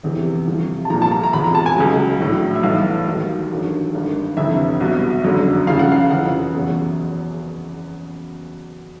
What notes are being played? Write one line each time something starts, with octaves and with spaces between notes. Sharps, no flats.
F1 E2 C3 E3
C2 C3 F3
A5
C2 A#2 F3 A#5
A5
A#5
A#5
E1 E2 C3 B5
A#5
A5
G#5
C#2 C#3 F#3
A#1 A2 F#3
E5
B1 A2 E3 F5
D#2 D#3 F#3
A1 G2 D#3 F#3
G#1 G2 D#3
G1 F2 C3 E3 E5
C2 B2 F#3
F#1 F2 D3 F#3
D#2 C#3 F3 F5
F#5
F5
F1 F2 C#3 E3 F#5
F#1 E2 B2 F#3